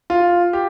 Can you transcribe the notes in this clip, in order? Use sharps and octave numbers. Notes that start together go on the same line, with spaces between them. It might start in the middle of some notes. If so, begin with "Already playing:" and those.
F4
G4